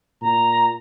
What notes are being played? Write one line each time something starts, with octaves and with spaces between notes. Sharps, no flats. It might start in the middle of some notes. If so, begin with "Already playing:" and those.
A#2 A#5